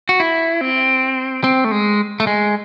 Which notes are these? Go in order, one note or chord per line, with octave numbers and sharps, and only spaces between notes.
F#4
E4
C4
C4
A3
G#3
A3
G#3